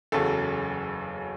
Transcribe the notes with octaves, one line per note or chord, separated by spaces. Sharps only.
F#1 E2 C#3 F#3 A4